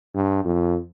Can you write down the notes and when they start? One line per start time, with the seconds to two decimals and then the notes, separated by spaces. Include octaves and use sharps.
0.15 G2
0.45 F2